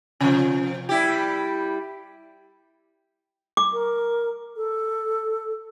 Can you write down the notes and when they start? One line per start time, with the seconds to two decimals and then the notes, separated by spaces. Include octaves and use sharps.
0.21 C3 F3
0.89 G3 E4 G4
3.57 D6
3.73 A#4
4.57 A4